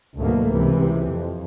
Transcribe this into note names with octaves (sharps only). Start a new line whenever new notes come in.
D2 G#2 B2 F#3 A3 A#3
C#2 C3 E3
F2